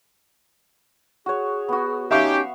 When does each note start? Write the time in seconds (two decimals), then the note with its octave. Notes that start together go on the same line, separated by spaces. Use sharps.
1.26 F#4 G#4 C#5
1.69 B3 F#4
2.11 C#4 D#4 G4 E5 F5 C#6